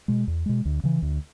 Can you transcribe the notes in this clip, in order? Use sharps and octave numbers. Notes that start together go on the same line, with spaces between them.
B2 G#3
E2
B2 G#3
D2
C#3 E3
D2